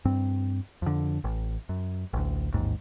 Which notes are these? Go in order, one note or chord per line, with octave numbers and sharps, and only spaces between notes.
G2 C4
F2 D3
A1
F#2
A1 D2
A1 D#2 G#2